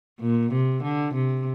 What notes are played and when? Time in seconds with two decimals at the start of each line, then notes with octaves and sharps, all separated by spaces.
0.21 A#2
0.52 C3
0.83 D3
1.14 C3